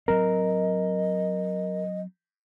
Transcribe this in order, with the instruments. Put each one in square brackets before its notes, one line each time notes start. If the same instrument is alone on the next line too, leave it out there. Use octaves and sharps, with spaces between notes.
[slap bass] F#3 C4 [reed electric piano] A#4 [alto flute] D#5